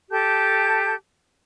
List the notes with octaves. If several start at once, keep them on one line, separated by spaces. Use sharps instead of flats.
G4 A4 A5 G6